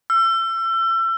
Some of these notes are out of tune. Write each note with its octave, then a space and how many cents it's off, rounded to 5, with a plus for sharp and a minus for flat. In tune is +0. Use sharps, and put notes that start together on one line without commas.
E6 +35